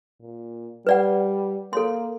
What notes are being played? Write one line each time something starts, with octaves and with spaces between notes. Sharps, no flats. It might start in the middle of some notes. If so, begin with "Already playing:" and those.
A#2
G3 B4 D5 F#5
A#3 A4 C#5 C6